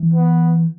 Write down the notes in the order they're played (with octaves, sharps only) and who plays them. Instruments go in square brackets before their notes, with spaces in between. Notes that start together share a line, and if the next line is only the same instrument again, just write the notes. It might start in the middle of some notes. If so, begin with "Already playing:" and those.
Already playing: [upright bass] E3
[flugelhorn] B3